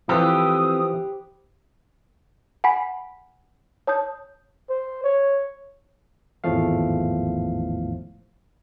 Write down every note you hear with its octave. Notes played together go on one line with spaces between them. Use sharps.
E3 F3 C4 G4 A4 B4 C5 D#6
F#5 G#5 B5 B6
C#5 A5 D#6 G6
C5
C#5
G#1 E2 A2 F3 A3 F5